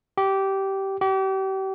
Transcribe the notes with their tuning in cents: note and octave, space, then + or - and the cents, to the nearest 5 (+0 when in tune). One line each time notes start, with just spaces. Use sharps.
G4 -15
G4 -35